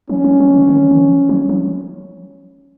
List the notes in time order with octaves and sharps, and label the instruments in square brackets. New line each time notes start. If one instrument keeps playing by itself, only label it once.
[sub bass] F3 [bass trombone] C#4
[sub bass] F#3
F3
D#3
D#3
D#3
F3
F#3
F3